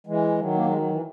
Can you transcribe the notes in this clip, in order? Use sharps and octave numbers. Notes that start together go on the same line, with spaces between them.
E3 G#3
D#3 F#3
A#3
G#3
F#3
E3